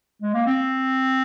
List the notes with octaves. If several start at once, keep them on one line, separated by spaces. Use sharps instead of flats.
G#3
A#3
C4